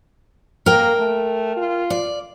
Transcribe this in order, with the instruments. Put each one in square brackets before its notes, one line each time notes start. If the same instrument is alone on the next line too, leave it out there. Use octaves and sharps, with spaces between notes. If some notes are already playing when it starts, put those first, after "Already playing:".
[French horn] A#3 [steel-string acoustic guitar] A#4 G5
[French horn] A3
F4
[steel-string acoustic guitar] D5